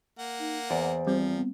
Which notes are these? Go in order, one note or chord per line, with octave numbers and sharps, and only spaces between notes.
A#3 F#5
D#4
E2 C5 D5
F3 G3 C4
B3